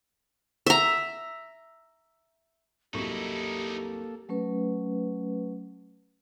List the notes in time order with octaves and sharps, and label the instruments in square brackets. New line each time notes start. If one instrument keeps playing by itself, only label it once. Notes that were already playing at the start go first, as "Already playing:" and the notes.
[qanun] E5 A#5
[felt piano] C2 F#2 C#6 [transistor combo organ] A#3 A4 [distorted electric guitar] D#4 E4 [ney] G4
[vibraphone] F#3 A3 C#4 B4